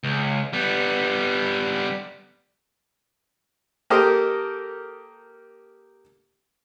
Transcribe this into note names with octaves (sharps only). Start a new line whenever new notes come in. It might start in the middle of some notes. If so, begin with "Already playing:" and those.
C#2
G3 B3
A#3 G4 A4 A#4 C5 D#5